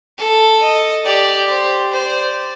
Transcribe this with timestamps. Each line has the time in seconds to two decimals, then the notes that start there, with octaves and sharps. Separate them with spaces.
0.18 A4
0.61 D#5
1.05 G4 D5
1.49 C5
1.93 C5 D5